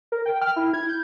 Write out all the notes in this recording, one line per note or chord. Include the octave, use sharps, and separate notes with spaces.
A#4
G5
F6
E4
G#6
G6